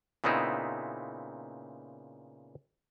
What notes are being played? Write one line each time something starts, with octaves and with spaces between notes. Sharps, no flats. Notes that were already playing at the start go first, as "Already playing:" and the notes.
A#2 C#3 B3 C4 D#4 E4